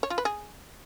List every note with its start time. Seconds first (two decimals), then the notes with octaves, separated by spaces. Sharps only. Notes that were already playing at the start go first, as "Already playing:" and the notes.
0.03 C#5
0.10 F4
0.18 B4
0.25 G#4